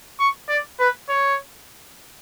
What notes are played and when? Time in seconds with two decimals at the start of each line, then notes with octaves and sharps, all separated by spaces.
0.19 C#6
0.49 D5
0.80 B4
1.09 C#5